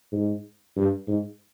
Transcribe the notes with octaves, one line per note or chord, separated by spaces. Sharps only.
G#2
G2
G#2